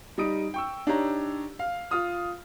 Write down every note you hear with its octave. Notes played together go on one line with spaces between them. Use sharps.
G3 D#4 D#6 D7
G5 C#6 E6
D4 D#4 G4 C#5 A#5
F5
F4 F5 D#6 F6